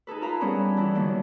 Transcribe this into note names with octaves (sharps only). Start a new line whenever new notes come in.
D#4 G#4 A4 B4
F4 A4 A#4 F5 A#5 B5
G3 B3 C#4 D4 E4 G#4
E3 D4 E4
D3 D#3 F#3 A#3